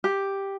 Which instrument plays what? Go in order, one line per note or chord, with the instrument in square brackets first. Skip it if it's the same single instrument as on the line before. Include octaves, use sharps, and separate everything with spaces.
[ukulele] G4